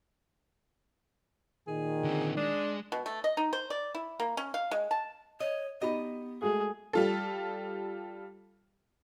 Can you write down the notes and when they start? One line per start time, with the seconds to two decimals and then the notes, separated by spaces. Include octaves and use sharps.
1.67 A#2 D#3 G#4
2.04 D3 C4
2.37 G#3 D4
2.92 B2
3.06 A3
3.24 D#5
3.37 D#4
3.53 C5
3.70 D5
3.95 E4
4.20 A#3
4.37 C#4
4.54 F5
4.71 G#3
4.91 A5
5.40 C#5 D#5
5.81 B3 D#4 G4 D#5 B5
6.42 G#3 A3 F#4 G#4
6.93 G3 F4 A4